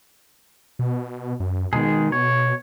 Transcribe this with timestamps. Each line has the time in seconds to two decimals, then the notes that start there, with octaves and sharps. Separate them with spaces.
0.79 B2
1.40 F#2
1.73 B2 D#3 G#3 G#4
2.12 C#5